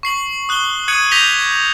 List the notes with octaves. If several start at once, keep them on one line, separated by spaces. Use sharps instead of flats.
C#6 C7 F#7
D#6 F#6 F#7 G7
D#6 F#6 G#6 C#7 D#7 F#7
D6 G6 A#6 B6 F7 G7